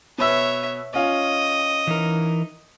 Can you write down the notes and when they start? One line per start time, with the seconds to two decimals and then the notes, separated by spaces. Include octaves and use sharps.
0.18 B2 B4 C#5 E5 E6
0.94 C#4 F4 D#5
1.87 E3 D#4 A#4